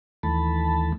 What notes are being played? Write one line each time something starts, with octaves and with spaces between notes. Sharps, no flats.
D#2 E3 A3 A5 B5